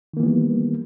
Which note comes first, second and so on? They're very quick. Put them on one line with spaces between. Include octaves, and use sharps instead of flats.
D#3 A#3 E3 B3 G3